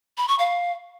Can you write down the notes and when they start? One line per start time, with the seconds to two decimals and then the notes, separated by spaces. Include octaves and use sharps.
0.18 B5
0.28 C#6
0.39 F5